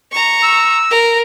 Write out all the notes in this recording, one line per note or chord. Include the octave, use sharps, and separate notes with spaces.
A#5 C#6
E6
A#4